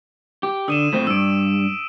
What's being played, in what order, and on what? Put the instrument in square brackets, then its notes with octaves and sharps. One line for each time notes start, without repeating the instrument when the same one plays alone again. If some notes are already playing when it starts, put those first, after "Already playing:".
[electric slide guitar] G4
[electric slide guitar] D3 [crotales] D#6 D#7 E7
[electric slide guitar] A2 F3 C4 [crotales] B6
[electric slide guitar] G2 [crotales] E6 D7